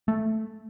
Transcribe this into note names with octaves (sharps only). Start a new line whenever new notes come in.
A3